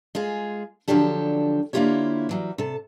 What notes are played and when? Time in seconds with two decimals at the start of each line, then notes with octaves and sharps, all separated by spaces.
0.15 G#3 F4 G#4
0.88 D3 F3 F#3 D4 G4 A4
1.73 D3 A#3 E4 F4 G4 C#5
2.29 E3 F#3 G3
2.58 C3 A4